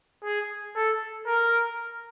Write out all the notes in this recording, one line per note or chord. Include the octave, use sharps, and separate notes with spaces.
G#4
A4
A#4